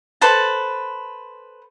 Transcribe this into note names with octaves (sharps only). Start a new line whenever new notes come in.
A4 B4 C5 A5